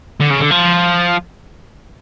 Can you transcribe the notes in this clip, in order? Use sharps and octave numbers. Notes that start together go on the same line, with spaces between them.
D3
C#3
D3
F3